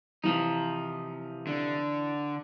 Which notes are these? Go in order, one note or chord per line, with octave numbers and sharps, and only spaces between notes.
C3 E3 F3 D#4
D3